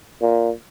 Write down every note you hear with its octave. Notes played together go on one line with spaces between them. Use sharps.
A#2